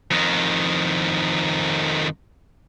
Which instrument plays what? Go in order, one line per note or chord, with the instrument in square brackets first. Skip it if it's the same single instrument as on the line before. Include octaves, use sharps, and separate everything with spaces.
[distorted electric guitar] F2 D#3